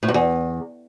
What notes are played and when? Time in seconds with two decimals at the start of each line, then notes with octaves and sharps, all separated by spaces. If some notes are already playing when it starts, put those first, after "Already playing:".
0.03 A2
0.08 G2
0.14 E2